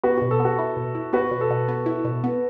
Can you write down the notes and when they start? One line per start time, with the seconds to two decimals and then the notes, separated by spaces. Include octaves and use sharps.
0.04 B3 F#4 B4
0.18 B2 F#4
0.31 A4
0.40 B3
0.45 F#4
0.59 E4
0.77 B2
0.95 E4
1.13 B3 F#4 B4
1.31 B2
1.41 A4
1.50 B2
1.68 B3
1.86 E4
2.05 B2
2.24 B3